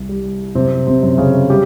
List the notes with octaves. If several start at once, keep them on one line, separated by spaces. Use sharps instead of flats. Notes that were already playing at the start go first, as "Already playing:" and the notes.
Already playing: C2
G3
F#2 C3 C4
C3 C4
F#2
C#3 C#4
G3 G4